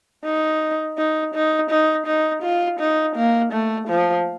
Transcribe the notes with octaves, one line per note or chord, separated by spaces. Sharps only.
D#4
D#4
D#4
D#4
D#4
F4
D#4
A#3
A3
F3